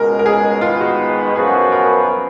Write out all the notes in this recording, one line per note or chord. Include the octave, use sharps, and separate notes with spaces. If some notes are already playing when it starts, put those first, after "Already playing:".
Already playing: C#2 B2 G#3 A#4
A#4
G#4
G#2 D#3 G#3 B3 D#4 F4
F#4
F#2 F3 B3 F#4 G#4 B4
A#4